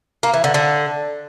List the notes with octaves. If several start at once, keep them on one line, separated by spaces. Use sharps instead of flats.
A#3
E3
D3
D3